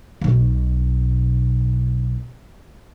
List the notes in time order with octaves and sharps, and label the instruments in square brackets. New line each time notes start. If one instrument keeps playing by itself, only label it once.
[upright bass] B1 B2